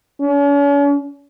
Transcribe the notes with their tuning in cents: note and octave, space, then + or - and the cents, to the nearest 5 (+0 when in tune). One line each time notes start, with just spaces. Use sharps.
C#4 +40